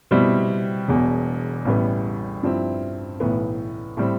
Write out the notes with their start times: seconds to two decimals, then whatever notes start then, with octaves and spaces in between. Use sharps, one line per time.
0.11 B2 G3 C4 E4
0.88 E1 E2 B2
1.65 A1 A2 G3 B3
2.43 G2 F3 C4 E4
3.20 B1 A2 E3 B3
3.97 A2 G3 C4